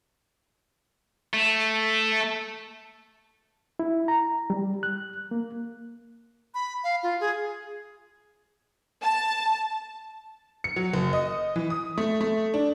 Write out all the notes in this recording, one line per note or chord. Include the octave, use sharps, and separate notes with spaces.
A3
E4
A#5
G3
F#6
A#3
B5
F5
F4
G#4
A5
C#7
F#3
F#1
D#5
E3
D#6
A3
A3
D4